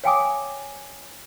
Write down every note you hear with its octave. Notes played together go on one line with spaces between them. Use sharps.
C#5 F5 G5 G#5 D6 D#6